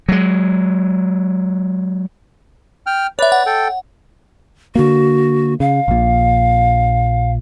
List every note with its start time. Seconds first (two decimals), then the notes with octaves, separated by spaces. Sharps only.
0.09 F#3 G#3
2.87 G5 F6
3.19 B4 C#5 D5 E5
3.32 F#5
3.46 A4 G5
4.75 D3 A#3 F#4
5.60 C#3 F5
5.88 A#1 A#2